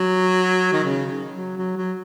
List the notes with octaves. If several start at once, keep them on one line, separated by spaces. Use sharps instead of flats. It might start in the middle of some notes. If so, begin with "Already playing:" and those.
Already playing: F#3
D#3
C#3
F#3
F#3
F#3